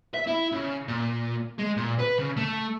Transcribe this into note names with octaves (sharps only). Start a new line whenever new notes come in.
E5
E4
C#3
A#2
G#3
A#2
B4
C#3
A3